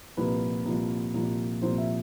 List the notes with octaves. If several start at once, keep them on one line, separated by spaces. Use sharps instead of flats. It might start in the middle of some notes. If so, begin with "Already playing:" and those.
C2 A#2 F3 B4
C2 A#2 F3
C2 A#2 F3
C2 A#2 F3 C5
E5